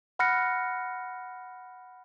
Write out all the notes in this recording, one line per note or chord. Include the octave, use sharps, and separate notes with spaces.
F#5 B5 F6 F#6 A#6 C#7